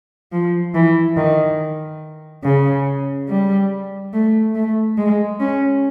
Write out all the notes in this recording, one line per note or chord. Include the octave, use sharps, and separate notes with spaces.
F3
E3
D#3
C#3
G3
A3
A3
G#3
C#4